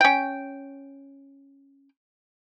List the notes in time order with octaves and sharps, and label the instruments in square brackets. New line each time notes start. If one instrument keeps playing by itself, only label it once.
[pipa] C#4 G5